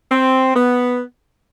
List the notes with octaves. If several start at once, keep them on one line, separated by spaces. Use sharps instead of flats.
C4
B3